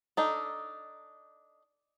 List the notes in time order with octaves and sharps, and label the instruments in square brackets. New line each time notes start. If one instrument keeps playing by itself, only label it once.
[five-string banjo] D4 D#4 A4